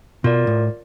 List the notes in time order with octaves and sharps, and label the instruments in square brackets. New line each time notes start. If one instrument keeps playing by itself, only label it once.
[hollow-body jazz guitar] B2 [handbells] F4 A#4 D5
[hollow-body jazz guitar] A2